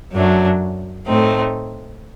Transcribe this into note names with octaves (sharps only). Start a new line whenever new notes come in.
F#2 F#3 A3 D4
A2 A3 C4 D#4